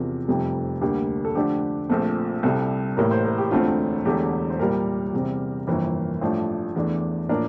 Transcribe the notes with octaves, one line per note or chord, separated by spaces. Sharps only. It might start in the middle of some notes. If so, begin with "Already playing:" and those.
Already playing: E2 C3 F3 C4 A#4
F1 F2 C3 G3 A4
D2 D3 G3 A#3 G4
A4
F2 D3 A3 D4 G4
A#1 A#2 A3 C4
C2 C3 G3 A4
A1 A2 G3 A#3 A#4
C5
A#4
G4
E1 D2 D3 A3 C4 F4
E1 E2 D3 A3 G4
C5
C2 A#2 G3 A#3 A#4
E2 C3 G3 C4
G1 F2 E3 A#3 A#4
A1 G2 F3 A3 D4 C5
E2 E3 A3 D4
A2 F3 A#3 D4 A#4